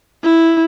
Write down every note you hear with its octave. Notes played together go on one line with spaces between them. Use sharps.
E4